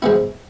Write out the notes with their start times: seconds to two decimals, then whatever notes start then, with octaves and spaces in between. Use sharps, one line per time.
0.02 F3 G#3 B3 E4